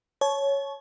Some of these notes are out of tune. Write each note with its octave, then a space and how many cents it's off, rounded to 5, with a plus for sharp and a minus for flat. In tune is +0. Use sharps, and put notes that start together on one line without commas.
C#5 +0 A5 -35